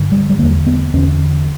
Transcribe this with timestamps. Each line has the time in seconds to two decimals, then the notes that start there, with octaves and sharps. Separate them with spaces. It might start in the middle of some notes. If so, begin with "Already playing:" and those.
Already playing: G2 D3
0.12 G3
0.30 G3
0.38 D3 A#3
0.42 E2
0.67 B3
0.94 E2 C#4
0.97 D3